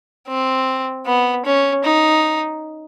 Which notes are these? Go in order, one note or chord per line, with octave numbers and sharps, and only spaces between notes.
C4
B3
C#4
D#4